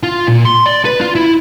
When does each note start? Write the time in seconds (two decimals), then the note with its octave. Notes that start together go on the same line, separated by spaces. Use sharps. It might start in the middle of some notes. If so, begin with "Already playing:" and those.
0.03 F4
0.28 A#2
0.45 C6
0.66 D5
0.85 B4
1.01 F4
1.15 E4